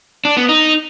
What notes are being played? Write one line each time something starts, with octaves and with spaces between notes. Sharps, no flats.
D4
B3
D#4